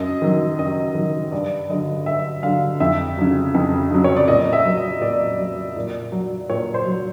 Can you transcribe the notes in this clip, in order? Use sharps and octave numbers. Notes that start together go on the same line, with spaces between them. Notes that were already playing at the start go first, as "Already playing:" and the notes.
Already playing: F#2 D#5
D#3 F#3
F#2 D#5
D#3 F#3
G2 D5
D3 F#3 D#5
G2 E5
D3 F#3 F5
F2 E5
C#3 F#3
F2
C#3 F#3
C#5
D5
A#2 D#5
E5
F#3
D#5
A#2 D5
F#3
A#2
F#3
A#2 C#5
C5
F#3